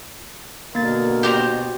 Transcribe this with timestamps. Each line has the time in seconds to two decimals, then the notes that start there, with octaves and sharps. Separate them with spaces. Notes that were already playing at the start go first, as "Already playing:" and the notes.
0.75 B2 D3 A#3 A#4 A6
1.23 G4 C5 A#5